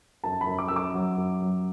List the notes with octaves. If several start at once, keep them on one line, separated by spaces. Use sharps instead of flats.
F#2 A5
B5
F#2
D6
F#2 E6
D6
F#3
F#2
F#3